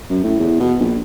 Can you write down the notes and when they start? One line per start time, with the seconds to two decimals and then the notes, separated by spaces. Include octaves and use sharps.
0.10 F#2
0.24 A2
0.40 E2
0.60 B2
0.80 A#1